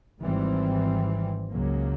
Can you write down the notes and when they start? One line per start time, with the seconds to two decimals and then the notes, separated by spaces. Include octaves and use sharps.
0.20 G#1 G#2 E3 G3 C4
1.51 C#2 C#3 F#3 A#3